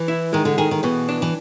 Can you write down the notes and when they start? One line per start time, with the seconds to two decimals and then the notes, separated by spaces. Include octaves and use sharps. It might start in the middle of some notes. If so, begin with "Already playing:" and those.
Already playing: E3
0.08 E4
0.33 D#3 G#3
0.45 D3
0.58 D#3 G#4
0.71 D#3
0.83 B2 E3
1.09 D4
1.22 E3